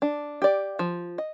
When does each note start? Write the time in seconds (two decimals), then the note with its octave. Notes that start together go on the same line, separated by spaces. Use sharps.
0.02 D4
0.42 G4 D5
0.79 F3
1.18 D#5